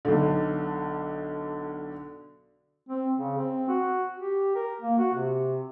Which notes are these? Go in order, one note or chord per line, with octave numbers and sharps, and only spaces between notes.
B1 D3
C4
C#3
C4
F#4
G4
A#4
A#3
F#4
C3